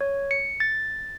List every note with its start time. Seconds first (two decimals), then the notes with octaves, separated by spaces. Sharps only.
0.01 C#5
0.31 C#7
0.60 A6